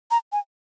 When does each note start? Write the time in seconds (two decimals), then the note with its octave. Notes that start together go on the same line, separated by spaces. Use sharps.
0.11 A#5
0.32 G#5